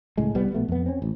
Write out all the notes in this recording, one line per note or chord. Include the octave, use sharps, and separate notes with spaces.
C#2 A2 G#3
C2 G3 B3
A#1 B2 A3 B3
F2 B3
C4 C#4
A1